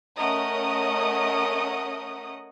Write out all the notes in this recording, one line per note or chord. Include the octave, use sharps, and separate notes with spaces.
A3 C#4 A#4 D#5 F#5 D#6